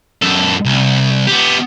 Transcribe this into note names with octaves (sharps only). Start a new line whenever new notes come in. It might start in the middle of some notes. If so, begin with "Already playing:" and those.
F#2 A4
C2
B3 G4